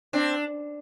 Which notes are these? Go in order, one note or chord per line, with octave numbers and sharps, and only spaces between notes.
C4 D4